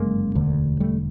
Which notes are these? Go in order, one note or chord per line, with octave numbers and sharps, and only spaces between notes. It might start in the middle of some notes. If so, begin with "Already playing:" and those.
Already playing: G1 F#2 C#3 G#3 A#3
E1 D2 D3
G3 A3